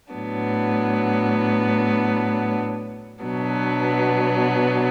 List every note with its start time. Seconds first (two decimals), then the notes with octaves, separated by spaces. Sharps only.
0.13 A2 F#3 B3 D4
3.23 B2 F#3 B3 D4